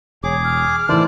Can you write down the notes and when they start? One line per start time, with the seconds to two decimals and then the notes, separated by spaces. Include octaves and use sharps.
0.24 E1 G#4 C#5 D6
0.44 F6
0.89 A2 D#3 E3 C5 D5 A5